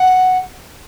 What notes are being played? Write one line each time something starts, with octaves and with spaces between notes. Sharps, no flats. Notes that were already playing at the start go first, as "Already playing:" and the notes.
Already playing: F#5